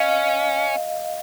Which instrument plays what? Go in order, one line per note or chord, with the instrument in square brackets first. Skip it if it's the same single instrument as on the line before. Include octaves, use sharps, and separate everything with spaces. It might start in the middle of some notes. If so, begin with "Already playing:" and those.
Already playing: [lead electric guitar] C#4 [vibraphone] D#5 F5